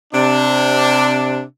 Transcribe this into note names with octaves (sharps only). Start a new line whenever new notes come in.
C3 D4